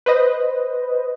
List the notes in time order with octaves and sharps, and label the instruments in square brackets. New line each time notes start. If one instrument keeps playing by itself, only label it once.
[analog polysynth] B4 C5 D#5